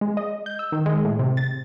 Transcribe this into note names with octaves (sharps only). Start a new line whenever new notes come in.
G#3
D#5
G6
E6
D#3
G#3
A2
C3
A6